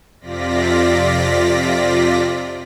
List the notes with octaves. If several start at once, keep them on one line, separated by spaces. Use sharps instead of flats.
F2 C3 F4 D5 A#6 B6